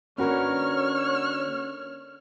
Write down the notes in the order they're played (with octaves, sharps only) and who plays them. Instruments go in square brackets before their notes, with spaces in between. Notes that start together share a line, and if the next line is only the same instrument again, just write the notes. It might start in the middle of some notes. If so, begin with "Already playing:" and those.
[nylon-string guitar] D3 A#3 B4 [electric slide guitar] C#4 F#4 A#4 [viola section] C#5 [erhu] F6